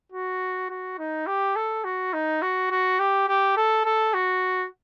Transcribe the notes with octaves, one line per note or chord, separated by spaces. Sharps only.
F#4
F#4
D#4
G4
A4
F#4
D#4
F#4
F#4
G4
G4
A4
A4
F#4